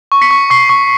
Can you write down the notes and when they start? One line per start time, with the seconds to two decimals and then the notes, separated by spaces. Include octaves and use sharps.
0.12 C#6
0.22 B6 C#7
0.31 C#6
0.50 C#6 C7
0.69 C#6